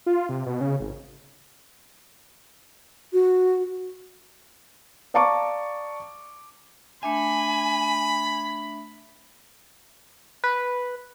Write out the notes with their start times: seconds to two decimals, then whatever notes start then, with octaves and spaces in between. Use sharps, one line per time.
0.06 F4
0.29 C3
0.46 B2
0.61 C#3
0.80 G#1
3.13 F#4
5.14 D5 F5 A5 A#5 C#6 D6
7.03 A3 D4 E5 G#5 B5
10.44 B4